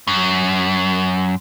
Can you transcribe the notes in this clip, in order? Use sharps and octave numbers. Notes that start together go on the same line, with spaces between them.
F#2